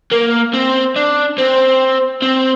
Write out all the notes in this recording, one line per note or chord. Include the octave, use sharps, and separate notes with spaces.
A#3
C4
D4
C4
C4